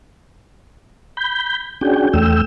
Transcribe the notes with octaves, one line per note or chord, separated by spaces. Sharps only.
B5 G6
C#4 D4 F#4 G#4 G5
E2 A3 G5 E6